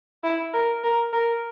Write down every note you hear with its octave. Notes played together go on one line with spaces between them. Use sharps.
E4
A#4
A#4
A#4